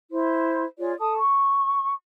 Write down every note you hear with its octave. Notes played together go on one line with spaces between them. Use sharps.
E4 C5 C6
F4 G#4 C#5 D5
A4 A5 D#6
C#6